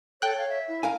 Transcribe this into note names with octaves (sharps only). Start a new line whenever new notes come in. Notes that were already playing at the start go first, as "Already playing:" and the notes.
A4 C#5 G5 F#6
F5
E5
E4
A#4 F5 G#5